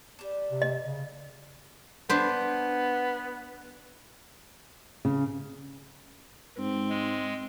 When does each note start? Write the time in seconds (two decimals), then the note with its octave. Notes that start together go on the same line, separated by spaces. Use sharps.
0.19 G3 D4
0.50 C3
0.62 D#5
0.82 C#3
2.09 B3 D4 B4 C5
5.05 C#3
6.58 G#2 C4
6.90 G#3